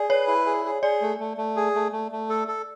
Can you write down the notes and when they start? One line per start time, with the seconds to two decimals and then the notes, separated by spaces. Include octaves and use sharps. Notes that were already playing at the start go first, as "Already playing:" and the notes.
Already playing: G#4 D5
0.10 B4 C#5
0.28 E4
0.46 G#4
0.65 G#4
0.82 G#4 D5
1.02 A3
1.20 A3
1.37 A3
1.56 G#4
1.75 A3
1.92 A3
2.12 A3
2.30 A4
2.48 A4